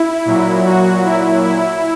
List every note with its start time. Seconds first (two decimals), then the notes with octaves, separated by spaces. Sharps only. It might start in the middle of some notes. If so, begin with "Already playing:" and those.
Already playing: E4
0.25 A#2 F#3
0.65 F#4
1.04 E4
1.43 E4